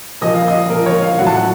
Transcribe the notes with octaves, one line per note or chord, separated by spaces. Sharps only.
A#2 F3 D#5
F5
D#5
A#2 F3 A#4
C#5
F5
A2 F#3 F#5
A5
F#5